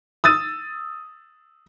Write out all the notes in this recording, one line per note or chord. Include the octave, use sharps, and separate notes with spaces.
D#6 E6 A6 D#7